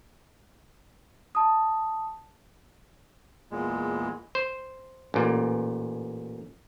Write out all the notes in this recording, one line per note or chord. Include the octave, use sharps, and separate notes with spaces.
A5 D#6
E2 A#2 G#3
C5
A1 A#2